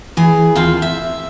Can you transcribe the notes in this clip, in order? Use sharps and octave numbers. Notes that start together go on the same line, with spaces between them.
E3 G#4
D#2 C4 F4
E5